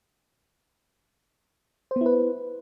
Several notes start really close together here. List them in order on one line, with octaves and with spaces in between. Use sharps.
C5 B3 E4 B4